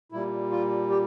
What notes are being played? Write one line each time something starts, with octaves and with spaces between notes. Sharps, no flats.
A#2 G3 E4
F4
G4